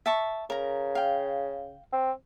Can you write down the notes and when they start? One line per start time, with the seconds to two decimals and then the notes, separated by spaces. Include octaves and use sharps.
0.06 E5 A5 C#6
0.50 C#3 A#4 A#5
0.95 F5 G5
1.92 C4